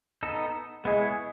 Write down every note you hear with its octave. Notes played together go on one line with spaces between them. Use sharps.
B3 D#4 A4
G#3 B3 E4 G#4 C#5